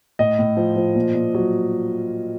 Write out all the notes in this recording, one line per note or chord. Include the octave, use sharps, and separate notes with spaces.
A2 D#5
A2
F3
F3
A#2
A#2
F#3